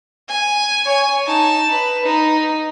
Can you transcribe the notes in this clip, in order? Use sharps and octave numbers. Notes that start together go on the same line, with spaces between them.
G#5
C#5 G#5
D#4 A5
B4
D#4